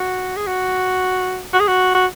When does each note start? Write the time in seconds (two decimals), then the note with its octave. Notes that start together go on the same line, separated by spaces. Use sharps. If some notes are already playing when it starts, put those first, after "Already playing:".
Already playing: F#4
0.36 G#4
0.47 F#4
1.53 F#4
1.60 G#4
1.68 F#4
1.95 F#4